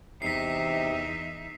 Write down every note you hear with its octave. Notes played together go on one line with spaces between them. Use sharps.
E2 C3 D#4 E5 B6 C7